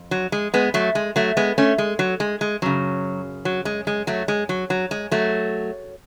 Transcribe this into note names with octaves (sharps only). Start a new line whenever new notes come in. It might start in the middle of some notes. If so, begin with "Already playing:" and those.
Already playing: F2
F#3
G#3
G#3 B3
F#3 A3
G#3
F#3 A3
G#3 B3
A3 C#4
G#3
F#3
G#3
G#3
F#2 C#3 F#3
F#3
G#3
G#3
F#3 A3
G#3
F#3
F#3
G#3
F#3 A3